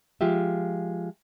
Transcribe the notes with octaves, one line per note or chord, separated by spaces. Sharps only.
F3 G#3 F4 G4 E5